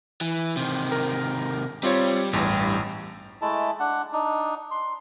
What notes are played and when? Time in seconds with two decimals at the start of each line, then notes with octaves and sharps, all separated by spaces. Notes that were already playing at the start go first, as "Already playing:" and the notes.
0.21 E3
0.57 C3 D#3
0.92 A#4
1.83 G3 C4 F4 C#5
2.33 A1 E2 G2
3.42 G#3 A3 E4 A5
3.80 D4 F#5
4.13 D4 D#4
4.71 C6